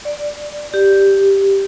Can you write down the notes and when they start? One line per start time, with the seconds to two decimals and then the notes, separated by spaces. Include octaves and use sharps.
0.05 D5
0.74 G4